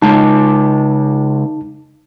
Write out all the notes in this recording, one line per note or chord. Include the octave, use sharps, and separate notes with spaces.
C#3 G#3 D#4 A5